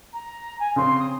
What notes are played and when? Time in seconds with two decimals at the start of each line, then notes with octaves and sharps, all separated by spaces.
0.13 A#5
0.59 G#5
0.76 C#3 C4 C6
0.99 D#6